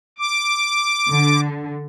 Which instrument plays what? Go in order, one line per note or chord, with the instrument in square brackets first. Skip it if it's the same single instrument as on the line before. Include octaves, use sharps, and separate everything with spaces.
[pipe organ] D6
[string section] D3